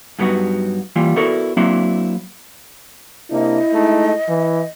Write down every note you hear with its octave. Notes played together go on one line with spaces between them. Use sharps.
G2 F#3 G3 B3 D#4 F#4
E3 G3 A#3 F4
B3 E4 F#4 A4 A#4 D5
F#3 A#3 C4 D4 E4 F#4
C3 A#3 D4 E4 D#5
G#3 A3 D#4
E3